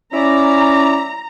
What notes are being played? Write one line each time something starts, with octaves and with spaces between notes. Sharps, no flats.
C#4 E4 D5 A#5